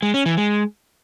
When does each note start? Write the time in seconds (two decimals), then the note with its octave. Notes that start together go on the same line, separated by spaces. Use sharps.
0.03 G#3
0.14 C#4
0.26 E3
0.37 G#3